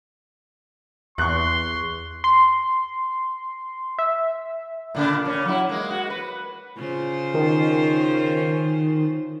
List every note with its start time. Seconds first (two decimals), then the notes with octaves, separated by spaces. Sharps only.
1.18 E2 C6 C#6 F#6
2.24 C6
3.99 E5
4.95 A#2 C#3 D4
5.25 A#2 C#4
5.45 F#3 E4
5.69 G#3 A#3
5.90 F#4
6.10 B4
6.77 C#3 F4 C5
7.34 D#3